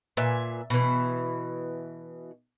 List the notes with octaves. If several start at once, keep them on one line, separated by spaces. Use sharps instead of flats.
A#2 B4 E5 G#5
B2 E3